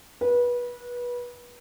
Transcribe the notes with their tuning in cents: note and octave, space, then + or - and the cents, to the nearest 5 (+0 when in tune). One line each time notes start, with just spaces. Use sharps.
B4 -25